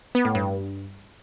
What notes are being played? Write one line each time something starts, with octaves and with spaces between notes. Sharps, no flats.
B3
A2
G2